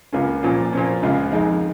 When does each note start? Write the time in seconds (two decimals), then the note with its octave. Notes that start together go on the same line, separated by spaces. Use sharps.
0.13 C#2 C#3 A#3 C#4 F4
0.43 A#2 F3 C#4 F4
0.73 A#2 F3 C#4
1.02 C#2 C#3 G#3 F4
1.32 F2 D#3 G#3 D#4